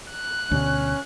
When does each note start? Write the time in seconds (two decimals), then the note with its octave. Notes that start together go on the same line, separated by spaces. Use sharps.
0.11 F#6
0.51 D2 B2 D3 C#4